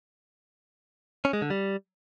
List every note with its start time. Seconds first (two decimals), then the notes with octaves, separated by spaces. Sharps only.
1.25 C#4
1.33 G#3
1.42 D3
1.50 G3